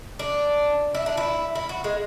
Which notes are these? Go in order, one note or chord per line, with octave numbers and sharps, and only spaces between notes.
D4
E4
D4
E4
E4
F#4
G#3